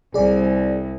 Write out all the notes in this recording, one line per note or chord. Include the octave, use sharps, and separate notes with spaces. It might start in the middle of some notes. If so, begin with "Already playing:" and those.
C2 G#4 D5